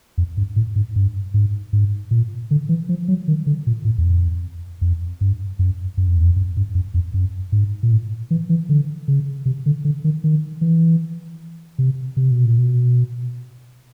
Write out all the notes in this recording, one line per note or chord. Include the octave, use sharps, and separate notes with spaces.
F2
G2
A2
G#2
G2
G#2
G#2
A#2
D3
E3
F3
F#3
D#3
D3
A#2
A2
E2
F2
F2
G2
F#2
F#2
F2
E2
F2
F#2
G2
F#2
F2
F#2
G#2
A#2
A2
E3
E3
D3
C#3
C3
D3
D3
D#3
D#3
E3
C3
C3
B2
A#2
B2